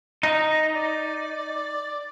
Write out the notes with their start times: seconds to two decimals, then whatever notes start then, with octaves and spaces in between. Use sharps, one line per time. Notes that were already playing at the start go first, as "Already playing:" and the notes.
0.23 D#4 A#5
0.75 D5